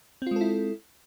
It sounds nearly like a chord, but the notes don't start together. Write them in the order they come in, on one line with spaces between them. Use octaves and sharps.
C4 F4 G#3 A4 E4